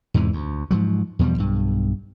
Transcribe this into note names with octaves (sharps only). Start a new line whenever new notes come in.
E2 G#2 C3 E3
D2
G#2 F3 F#3
E2 B2 F3 G3
B1 G2